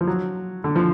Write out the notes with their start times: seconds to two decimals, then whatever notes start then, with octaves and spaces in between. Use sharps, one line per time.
0.01 F3
0.07 F#3
0.64 D3
0.76 F3